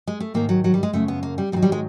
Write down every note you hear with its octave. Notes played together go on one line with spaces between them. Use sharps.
G#3
A3
G#2 D#3 F#3 A#3
F#3
F#3
G3
G#3
F#2 C#3 F3 A3
B3
A#3
G3
G#2 D#3 F#3 G3
G3
G#3